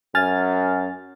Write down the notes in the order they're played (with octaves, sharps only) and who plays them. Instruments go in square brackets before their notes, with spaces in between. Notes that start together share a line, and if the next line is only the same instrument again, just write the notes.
[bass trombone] F#2 [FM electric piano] G#5 F6 A6